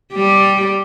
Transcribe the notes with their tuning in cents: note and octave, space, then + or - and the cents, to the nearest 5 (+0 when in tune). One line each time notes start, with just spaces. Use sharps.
G3 +0 G4 +0